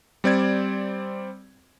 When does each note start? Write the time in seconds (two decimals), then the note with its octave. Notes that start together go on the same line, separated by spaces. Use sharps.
0.24 G3 C4 D5 G#6